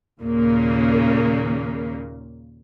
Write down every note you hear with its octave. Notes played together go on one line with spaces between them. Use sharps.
D#2 A#2 C#3 A#3